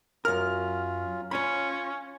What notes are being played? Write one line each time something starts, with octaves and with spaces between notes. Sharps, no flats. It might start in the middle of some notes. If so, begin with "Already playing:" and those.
F#2 F#3 C#4 F4 A#4 F6
C#4 F4 C#5 B5